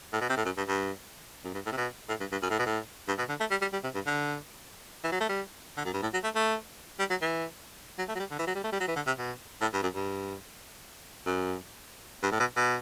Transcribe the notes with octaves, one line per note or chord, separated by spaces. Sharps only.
A2
B2
C3
A2
F#2
G2
G2
F#2
G2
A2
C3
B2
A2
G2
G2
F#2
A2
B2
A2
G2
B2
D3
A3
G3
G3
G3
C3
G2
D3
E3
F#3
A3
G3
D3
F#2
G2
A2
F#3
A3
A3
G3
F#3
E3
F#3
A3
F#3
G3
D3
E3
F#3
G3
A3
G3
F#3
E3
D3
C3
B2
A2
G2
F#2
G2
F#2
G2
A2
B2
B2